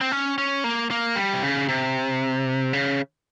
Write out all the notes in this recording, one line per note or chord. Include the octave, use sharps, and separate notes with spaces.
C4
C#4
C#4
A#3
A#3
G3
C3
C#3
C3
C#3